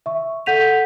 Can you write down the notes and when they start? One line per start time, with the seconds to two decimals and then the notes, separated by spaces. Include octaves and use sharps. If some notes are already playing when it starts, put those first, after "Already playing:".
0.06 E5 C#6
0.46 A4 F#5 G6 B6 D#7 F7